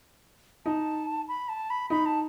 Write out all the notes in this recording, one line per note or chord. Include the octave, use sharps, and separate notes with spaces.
D#4 A5
B5
A5
B5
D#4 B5
A5